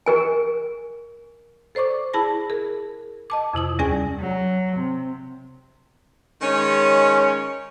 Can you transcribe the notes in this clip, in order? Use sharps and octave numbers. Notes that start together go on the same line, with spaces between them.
G#4 A#4 G#5
A4 C5 D5 C#6 D6
E4 G#4 A5 B5 A#6
G#4 A#4
D#5 A5 D6
F2 C3 E4 D#6
D#2 G3 C#4 G#4 D5 G#5
F#3
C3
D#3 G#3 C#4